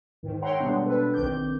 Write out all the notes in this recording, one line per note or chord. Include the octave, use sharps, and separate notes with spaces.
G#2 D#3
C#5 E5 F#5 G5 A#5 C6
B2 G3 G#3 B3 D4
B2 D4 A4 B4
A#1 D#3 C4 D6 G6